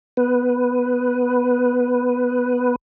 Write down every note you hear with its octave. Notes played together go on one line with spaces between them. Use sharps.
B3 B4